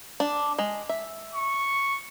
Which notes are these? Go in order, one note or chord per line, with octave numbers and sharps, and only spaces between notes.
D4
G#3
E5
C#6